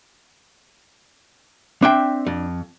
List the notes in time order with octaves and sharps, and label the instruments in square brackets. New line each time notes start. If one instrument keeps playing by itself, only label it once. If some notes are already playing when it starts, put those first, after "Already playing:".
[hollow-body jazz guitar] C4 E5 G5 [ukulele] D4
[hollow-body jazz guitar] F2